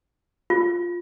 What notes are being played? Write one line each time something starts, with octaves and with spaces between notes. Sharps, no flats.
F4